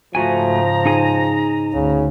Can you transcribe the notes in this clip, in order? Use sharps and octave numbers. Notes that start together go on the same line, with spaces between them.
G#2 C#3 F3 A3 F#4 G#5 A#5
D#4 G#4 G#5
D2 C#3